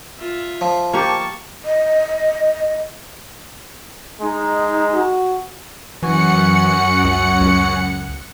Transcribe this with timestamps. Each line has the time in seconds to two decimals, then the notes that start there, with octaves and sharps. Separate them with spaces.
0.18 F4 E5
0.61 F3
0.93 A#3 G4 A5 C#6
1.65 D#5
4.22 G#3 D#4
4.94 F#4
6.03 F#2 E3 F#4 F#5 G#5 C#7
7.04 C#2
7.41 C#2